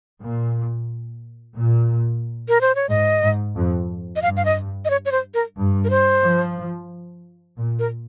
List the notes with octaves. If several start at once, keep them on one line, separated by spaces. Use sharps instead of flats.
A#2
A#2
A#4
C5
C#5
G#2 D#5
G#2
F2
D#5
G2 F5
F5
D#5
D#5
C#5
C#5
C5
A#4
G2
A#4
C5
F3
A#2
A#4